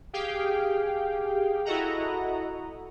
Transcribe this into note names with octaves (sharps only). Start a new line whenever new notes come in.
G4 G#4 F5 G5
E4 F#4 A4 D#5 F#5 A#5